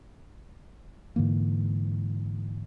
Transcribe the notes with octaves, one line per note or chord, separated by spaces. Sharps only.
G#2 D3 E3 A#3